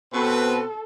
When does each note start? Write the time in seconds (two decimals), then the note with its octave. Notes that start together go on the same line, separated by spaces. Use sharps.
0.13 B2 C4 A4 B4